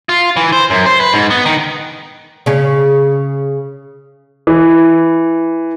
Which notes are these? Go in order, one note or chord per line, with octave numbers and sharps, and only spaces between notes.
F4
E3
C5
F#2
C5
B4
G#2
B3
D#3
C#3 C#4
E3